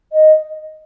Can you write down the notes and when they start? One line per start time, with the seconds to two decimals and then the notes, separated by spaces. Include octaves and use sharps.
0.12 D#5